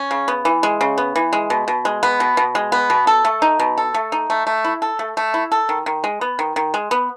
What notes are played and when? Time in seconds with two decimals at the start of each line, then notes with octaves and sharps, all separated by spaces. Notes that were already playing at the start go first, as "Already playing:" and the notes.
Already playing: C#4
0.11 C#3
0.28 B3
0.45 E3
0.63 G#3
0.81 C#3
0.98 B3
1.16 E3
1.33 G#3
1.50 B2
1.68 B2
1.85 G#3
2.03 B3
2.20 B2
2.37 B2
2.55 G#3
2.72 B3
2.90 B2
3.07 A4
3.25 A3
3.42 D#4
3.60 B2
3.78 A4
3.94 A3
4.12 D#4
4.30 A3
4.47 A3
4.64 E4
4.82 A4
4.99 A3
5.17 A3
5.34 E4
5.52 A4
5.69 D#3
5.86 D#3
6.04 G#3
6.21 B3
6.39 D#3
6.56 D#3
6.74 G#3
6.91 B3